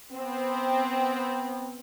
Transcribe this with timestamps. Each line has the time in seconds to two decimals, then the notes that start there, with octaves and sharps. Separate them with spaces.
0.12 B3 C4